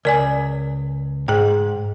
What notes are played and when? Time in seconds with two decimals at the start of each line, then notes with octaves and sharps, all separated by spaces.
0.05 C#2 A#4 D5 G#5
1.28 G#2 G#4 G5